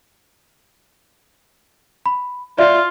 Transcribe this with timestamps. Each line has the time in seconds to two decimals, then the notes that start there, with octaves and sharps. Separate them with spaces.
2.06 B5
2.59 F4 D5 E5